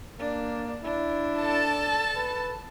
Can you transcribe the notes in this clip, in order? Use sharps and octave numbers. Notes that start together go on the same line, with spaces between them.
A#3 D4
D4 E4
A4 A5
B4